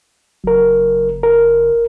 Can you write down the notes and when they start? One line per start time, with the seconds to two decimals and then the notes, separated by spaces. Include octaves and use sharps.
0.44 F#1 F#3 A#4
1.23 A#4